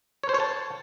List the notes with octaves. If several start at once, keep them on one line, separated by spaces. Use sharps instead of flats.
C#5
C5
C#5
A5